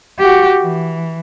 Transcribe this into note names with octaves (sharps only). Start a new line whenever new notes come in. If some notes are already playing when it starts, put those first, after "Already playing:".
F#4 G4
E3